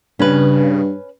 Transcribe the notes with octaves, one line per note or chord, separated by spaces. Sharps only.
G2 C#3 C#4 B4